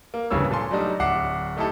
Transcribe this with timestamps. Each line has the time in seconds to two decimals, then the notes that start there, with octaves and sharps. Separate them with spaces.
0.14 A#3
0.30 D1 G2 C#3 E3 C#5 E6
0.51 A#2 A4 G#5 C6
0.71 F#3 G3 A3 D4 D#4 F#4
1.00 D1 E5 F#5 D6 C7
1.57 A3 D#4 E4 G4 A4